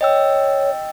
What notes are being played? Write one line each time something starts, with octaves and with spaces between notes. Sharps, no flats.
C#5 D#5 G5 E6